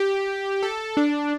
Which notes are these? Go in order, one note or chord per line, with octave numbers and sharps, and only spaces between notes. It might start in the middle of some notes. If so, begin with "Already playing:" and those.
Already playing: G4
A4
D4